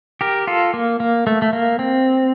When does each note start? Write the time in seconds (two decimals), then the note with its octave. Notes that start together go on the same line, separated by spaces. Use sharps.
0.21 G4 A#4
0.47 F4 A4
0.74 A#3
1.00 A#3
1.27 A3
1.42 A3
1.53 A#3
1.79 C4